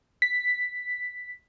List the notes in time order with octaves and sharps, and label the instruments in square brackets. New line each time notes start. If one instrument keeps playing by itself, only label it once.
[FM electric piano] B6